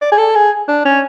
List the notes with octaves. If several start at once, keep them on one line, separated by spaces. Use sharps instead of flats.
D5
G#4
A4
G#4
D4
C#4